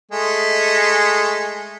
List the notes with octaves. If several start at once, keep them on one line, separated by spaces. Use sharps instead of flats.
G#3 A3